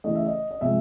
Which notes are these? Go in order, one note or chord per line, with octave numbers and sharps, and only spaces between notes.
C#3 E3 A3 D#5
E5
D#5
D#5
C3 F3 G#3 E5